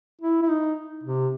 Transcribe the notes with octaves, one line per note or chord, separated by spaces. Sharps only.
E4
E4
D#4
C3